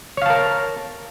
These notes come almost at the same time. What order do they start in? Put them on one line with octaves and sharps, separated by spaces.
C#5 F5 A5 A#4